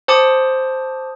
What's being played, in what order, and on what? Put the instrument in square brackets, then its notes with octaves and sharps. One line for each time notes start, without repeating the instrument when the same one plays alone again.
[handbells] C5 A5 D6 D#6